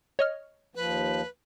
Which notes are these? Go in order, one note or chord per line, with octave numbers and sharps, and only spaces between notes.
C#5 D#5 F6
D#2 F3 B4